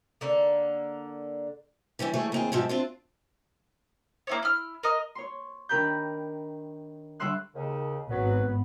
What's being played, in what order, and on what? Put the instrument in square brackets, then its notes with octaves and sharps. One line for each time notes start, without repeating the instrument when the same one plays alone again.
[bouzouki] D3 A#3
[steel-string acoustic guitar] E3 G3 B3 C#4
E3 G3 A3 G#4 C#5
D#2 C4 G#4
G#2 B2 F3 G3 E5
C4 D4 F4
[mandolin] A#3 E4 C#5
E4 F6
A#4 D#5
[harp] C#5 C6
D#3 D4 G4 A#4 B5 G6
D3 G3 C#5 E5 C6 F#6
[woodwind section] D#2 C#3
[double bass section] G#1 B3 [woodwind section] F#3 B4